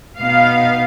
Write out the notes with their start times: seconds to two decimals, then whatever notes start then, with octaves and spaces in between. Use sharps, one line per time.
0.18 B2 B3 D#4 F5